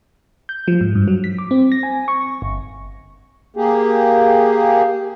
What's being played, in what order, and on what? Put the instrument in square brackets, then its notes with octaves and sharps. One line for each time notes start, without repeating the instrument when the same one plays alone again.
[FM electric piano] G6
F3
G#2
G2
F#3
B6
D6
C4
A#6
G#5
C#6
G1
[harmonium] A#3 G4 G#4